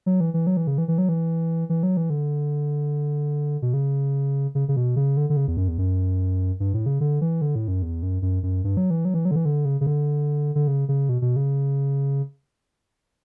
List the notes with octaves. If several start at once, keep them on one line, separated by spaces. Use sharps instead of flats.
F#3
E3
E3
F#3
E3
C#3
E3
E3
F#3
E3
E3
F#3
E3
D3
B2
C#3
C#3
C#3
B2
C#3
D3
D3
C#3
E2
F#2
E2
F#2
G2
A2
C#3
D3
E3
D3
A2
F#2
E2
F#2
F#2
F#2
G2
F#3
E3
F#3
E3
F#3
D3
E3
D3
C#3
C#3
D3
D3
C#3
C#3
B2
B2
C#3